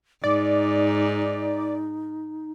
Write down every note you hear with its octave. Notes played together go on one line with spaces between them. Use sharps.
G#2 D#4 D5